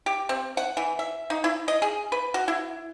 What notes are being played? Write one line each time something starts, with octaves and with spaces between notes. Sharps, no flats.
G4
C4
F#5
E3
E5
D#4
E4
D#5
G#4
B4
F#4
E4